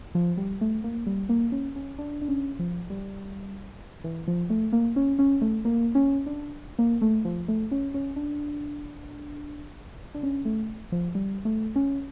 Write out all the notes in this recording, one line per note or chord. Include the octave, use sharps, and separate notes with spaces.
F3
G3
A3
A#3
G3
A#3
C#4
C#4
D4
D4
C#4
F3
G3
E3
F3
A3
A#3
C#4
C#4
A3
A#3
C#4
D4
A#3
A3
F3
A3
C#4
C#4
D4
D4
C#4
A3
F3
G3
A3
C#4